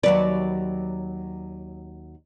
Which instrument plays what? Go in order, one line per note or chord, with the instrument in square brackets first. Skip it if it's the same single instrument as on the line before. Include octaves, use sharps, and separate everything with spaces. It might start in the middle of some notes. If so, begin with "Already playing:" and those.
[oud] D#2 F#3 B4 [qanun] D5